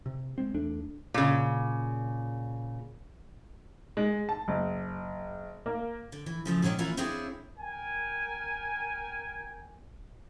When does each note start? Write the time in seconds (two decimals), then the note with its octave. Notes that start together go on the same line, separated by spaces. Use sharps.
0.06 C3
0.38 G#3 C4
0.54 E2 A3 D4
1.14 A#2 C#3
3.97 G#3
4.29 A5
4.48 F#1
5.66 A#3
6.12 D3
6.26 E3
6.45 C#3 F3 A3
6.62 A#2 D3 D#3 C#4 D4
6.79 E3 A#3 C#4 E4 F4
6.97 C4 D4 E4 F4 G#4 C#5
7.59 A#4 G5 G#5